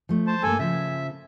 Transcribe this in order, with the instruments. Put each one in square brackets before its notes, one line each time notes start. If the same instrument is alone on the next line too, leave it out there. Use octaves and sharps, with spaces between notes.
[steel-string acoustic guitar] F3 A3
[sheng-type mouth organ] C5 A5
[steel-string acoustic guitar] G2 A#3 [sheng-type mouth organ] A4 G#5
[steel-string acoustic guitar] C#3 F3 [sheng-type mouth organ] E5